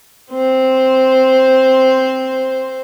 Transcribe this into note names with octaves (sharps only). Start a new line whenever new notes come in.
C4 C5